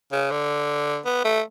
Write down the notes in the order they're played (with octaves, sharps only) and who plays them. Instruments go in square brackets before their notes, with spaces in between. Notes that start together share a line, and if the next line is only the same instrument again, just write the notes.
[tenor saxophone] C#3
D3
B3
A3